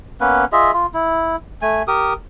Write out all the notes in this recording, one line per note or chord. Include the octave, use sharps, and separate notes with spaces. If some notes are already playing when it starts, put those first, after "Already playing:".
A#3 B3 C#4 B4
F4 G#4 D#5 E5
F4
E4
A3 G#5
G4 A#4 D#6